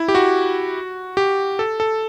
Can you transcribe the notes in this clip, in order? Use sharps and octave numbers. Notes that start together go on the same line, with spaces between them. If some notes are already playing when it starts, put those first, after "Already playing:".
Already playing: E4
G4
F#4
G4
A4
A4